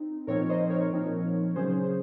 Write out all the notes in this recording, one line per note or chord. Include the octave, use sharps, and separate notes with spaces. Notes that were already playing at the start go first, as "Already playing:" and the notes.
Already playing: C4 D#4
A#2 F3 C4 D#4 A#4 C#5
C5 D#5
A#4 C#5
A#2 F3 C4 D#4
C#3 F#3 C#4 G#4 C5